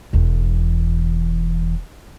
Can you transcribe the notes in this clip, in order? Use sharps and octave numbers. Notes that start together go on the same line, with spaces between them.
E1 E2